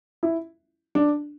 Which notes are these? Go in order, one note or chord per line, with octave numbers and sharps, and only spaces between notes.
E4
D4